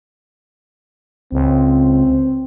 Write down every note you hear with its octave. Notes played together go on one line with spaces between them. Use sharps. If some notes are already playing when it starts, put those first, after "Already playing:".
C#2 C4